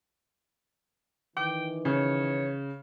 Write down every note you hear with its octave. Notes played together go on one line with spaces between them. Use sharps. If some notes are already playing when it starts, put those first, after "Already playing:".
D#3 E3 G5 D6
C#3 C#5